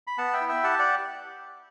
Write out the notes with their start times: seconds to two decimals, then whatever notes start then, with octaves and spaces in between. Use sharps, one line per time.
0.07 B5
0.18 B3 F#5 A5
0.33 E5 G5
0.41 E4
0.49 E5 G5
0.64 G4 F#5 A5
0.79 D5 F#5